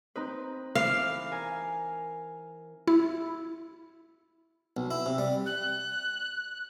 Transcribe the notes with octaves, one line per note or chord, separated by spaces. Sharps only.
C4 D#4 B4
E3 F5 D6 E6
A#4 G#5
E4
B1
E4
C3
G3
F#6